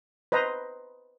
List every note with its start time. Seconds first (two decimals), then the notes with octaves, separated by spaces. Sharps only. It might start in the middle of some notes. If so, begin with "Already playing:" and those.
0.32 B4 C5 D#5 A#5